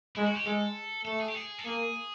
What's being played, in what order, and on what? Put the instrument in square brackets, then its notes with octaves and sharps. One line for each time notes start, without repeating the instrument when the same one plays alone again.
[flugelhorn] G#3 [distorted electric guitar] E4
[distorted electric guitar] F#4
G4
[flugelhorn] G#3 [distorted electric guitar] A4
[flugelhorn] A3 [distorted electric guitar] A4
[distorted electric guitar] G#4
G4
G#4
A4
[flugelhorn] A#3 [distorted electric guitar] G#4